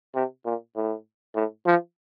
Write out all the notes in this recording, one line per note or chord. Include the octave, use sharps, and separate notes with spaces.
C3
A#2
A2
A2
F3